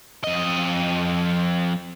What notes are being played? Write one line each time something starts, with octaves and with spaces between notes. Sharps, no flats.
F2 D#5